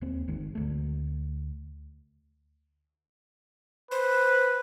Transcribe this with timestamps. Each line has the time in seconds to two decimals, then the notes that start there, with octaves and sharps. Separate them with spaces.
0.01 D#1 A#3 C4
0.28 G1 D#3 G#3
0.55 D2 A3
3.91 B4 C5